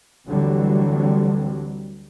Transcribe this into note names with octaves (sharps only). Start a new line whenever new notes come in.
D2 D3 E3 F#3 G3 C4